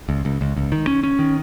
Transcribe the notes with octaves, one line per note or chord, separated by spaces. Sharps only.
C#2
C#2
C#2
C#2
D#3
C#4
C#4
D#3